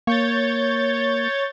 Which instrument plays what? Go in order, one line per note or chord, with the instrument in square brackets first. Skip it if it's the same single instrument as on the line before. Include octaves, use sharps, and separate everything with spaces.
[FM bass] A#3 [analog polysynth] C#5 G6 A6